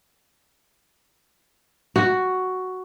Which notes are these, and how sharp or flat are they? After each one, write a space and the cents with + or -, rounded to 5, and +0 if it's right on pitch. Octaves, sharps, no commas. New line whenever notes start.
F#4 +5